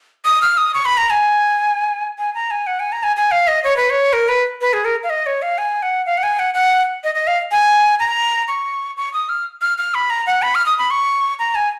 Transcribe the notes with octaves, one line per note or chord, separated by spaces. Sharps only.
D#6
F6
D#6
C#6
B5
A#5
G#5
G#5
A#5
G#5
F#5
G#5
A#5
G#5
G#5
F5
D#5
C#5
B4
C#5
A#4
B4
B4
G#4
A#4
F5
D#5
C#5
F5
G#5
F#5
F5
F#5
G#5
F#5
F#5
D#5
D#5
F5
G#5
A#5
C#6
C#6
D#6
F6
F6
F6
B5
A#5
F#5
B5
F6
D#6
B5
C#6
A#5
G#5